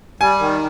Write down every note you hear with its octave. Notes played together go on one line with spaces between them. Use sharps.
G3 G#5
D#3